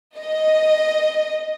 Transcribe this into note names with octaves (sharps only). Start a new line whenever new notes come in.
D#5